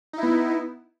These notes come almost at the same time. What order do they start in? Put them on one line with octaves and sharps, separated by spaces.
D#4 E4 B3